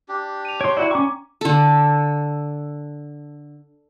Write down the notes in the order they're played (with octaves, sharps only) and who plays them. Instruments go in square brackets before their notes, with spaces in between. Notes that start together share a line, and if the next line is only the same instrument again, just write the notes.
[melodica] D4 G4
[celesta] D#7 F7
[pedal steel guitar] C#5 C6 [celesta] D7
[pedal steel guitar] E4 F#4 [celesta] D5
[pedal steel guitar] C#4 C#6 [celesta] G5 A#5 D6
[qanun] D3 A4